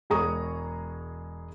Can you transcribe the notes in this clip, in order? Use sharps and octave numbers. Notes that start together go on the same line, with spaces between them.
E1 G#3 G#4 A#5 C#6 D#6